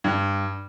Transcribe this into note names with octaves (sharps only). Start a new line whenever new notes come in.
G2